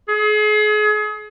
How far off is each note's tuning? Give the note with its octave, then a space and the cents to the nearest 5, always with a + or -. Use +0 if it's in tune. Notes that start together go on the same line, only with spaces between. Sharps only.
G#4 +35